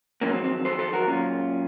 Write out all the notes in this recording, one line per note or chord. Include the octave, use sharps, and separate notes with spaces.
F2 C3 D#3 F#3 A#3 C#4
C4
C4
A4 C5
A4 C5
F#4 A#4
A#2 F#3 C#4 F4